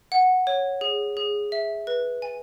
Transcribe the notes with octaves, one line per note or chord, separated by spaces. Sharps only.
F#5
C#5
G#4
G#4
E5
B4
G#5